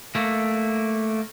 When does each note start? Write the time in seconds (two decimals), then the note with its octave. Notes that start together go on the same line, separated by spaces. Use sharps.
0.15 A3 A#3